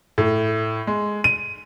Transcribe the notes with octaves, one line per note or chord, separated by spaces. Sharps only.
A2
G#3
D#7